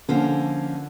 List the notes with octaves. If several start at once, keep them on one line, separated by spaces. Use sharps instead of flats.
D3 F3 A#3 C#4